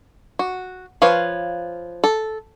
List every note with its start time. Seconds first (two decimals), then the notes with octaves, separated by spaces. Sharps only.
0.39 F#4
1.02 F3 B4 C#5 F5
2.04 A4